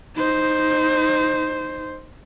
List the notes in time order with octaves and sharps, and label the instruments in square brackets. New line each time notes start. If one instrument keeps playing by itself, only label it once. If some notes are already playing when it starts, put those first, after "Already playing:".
[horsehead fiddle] D#4 C5